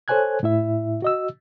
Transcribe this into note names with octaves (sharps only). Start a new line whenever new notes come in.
A4 C5 C#5 G#5 F#6 G#6
A2 E4 E5
F#4 D#5 E6